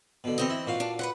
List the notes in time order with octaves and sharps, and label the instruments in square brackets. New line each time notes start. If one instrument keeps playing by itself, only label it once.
[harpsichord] B2 D3
[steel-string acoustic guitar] E3 C4 D#5
[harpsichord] E4
A#2 F#4 F5
[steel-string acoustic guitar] D4
B4 C5 F#5